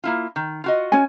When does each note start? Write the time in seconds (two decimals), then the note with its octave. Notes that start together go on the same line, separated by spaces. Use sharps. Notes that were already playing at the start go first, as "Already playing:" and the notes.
0.04 A#3 E4 F4
0.36 D#3
0.64 F4 F#4 D#5
0.92 C#4 G#5